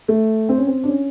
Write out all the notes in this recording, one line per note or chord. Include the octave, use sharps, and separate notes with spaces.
A3
C4
C#4
C4
D4
C#4